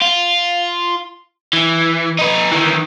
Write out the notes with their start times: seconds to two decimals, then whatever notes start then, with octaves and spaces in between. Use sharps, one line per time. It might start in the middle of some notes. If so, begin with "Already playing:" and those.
0.02 F4
1.53 E3
2.19 D#4 B4
2.52 D#3 E3